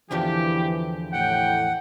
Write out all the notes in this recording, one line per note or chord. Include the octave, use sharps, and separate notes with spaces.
E2 D3 E3 F3 G4
A2 G4 F#5 G5